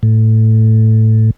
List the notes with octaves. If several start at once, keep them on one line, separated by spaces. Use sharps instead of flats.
A2